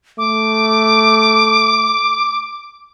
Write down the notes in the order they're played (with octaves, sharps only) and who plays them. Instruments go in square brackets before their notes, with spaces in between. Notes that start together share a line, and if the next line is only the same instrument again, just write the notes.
[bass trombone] A3 [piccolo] D6